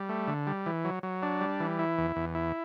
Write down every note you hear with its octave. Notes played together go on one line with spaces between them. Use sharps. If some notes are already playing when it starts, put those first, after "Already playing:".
Already playing: G3
A3
D3
G3
E3
F#3
F#3
D4
G3
E3
E4
E2
E2
E4